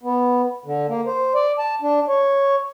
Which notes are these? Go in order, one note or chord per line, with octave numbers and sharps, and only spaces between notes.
B3
D3
A#3
C5
D5
A5
D4
C#5